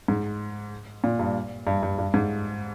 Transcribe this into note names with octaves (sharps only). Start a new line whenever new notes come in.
G#2
A#2
G2
G2
G2
G2
G#2